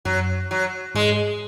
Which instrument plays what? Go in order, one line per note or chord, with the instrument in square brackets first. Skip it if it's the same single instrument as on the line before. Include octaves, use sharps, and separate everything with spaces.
[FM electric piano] F#2 [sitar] F#3
[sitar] F#3
[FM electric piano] G#2 [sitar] G#3